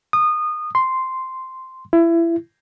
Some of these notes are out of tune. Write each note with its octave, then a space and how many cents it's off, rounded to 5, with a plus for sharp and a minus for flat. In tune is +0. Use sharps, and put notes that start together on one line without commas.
D#6 -25
C6 -5
E4 +25